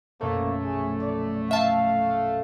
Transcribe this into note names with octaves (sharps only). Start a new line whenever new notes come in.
A#1 F#2 B2 A3 A#3
G#4
D5
E5 F5 A5